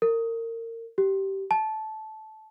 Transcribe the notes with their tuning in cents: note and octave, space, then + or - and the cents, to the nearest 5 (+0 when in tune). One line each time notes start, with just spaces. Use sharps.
A#4 -30
G4 -15
A5 -15